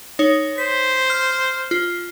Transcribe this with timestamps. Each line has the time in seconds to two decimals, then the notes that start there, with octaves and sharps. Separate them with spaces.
0.19 D#4 C#5
0.58 C5 B6
1.10 F6
1.71 F4